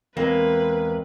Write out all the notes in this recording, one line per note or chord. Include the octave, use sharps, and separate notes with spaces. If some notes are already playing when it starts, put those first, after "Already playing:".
E2 G#3 A#3 C4 B4